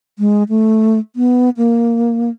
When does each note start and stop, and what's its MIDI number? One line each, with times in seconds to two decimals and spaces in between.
0.19 0.43 56
0.49 0.99 57
1.16 1.50 59
1.57 2.30 58